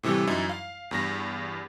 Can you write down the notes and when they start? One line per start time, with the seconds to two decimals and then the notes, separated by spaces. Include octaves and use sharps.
0.03 A2 C3 E3 G3 A3
0.27 F#2 E3 D#4 E4
0.49 F5
0.91 E2 G2 A#6